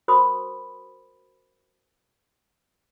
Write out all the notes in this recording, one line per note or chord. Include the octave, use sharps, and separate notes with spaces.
F#4 A#4 C5 B5 C6 D#6